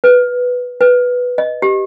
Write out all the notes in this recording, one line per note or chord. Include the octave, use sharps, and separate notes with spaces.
B4
B4
D#5
G4